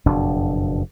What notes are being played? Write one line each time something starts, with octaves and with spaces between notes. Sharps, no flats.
F#1 F2 B2 D4